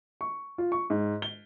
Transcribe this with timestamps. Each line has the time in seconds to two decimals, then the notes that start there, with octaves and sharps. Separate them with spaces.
0.21 C#6
0.58 F4
0.72 C#6
0.90 G#2
1.22 G7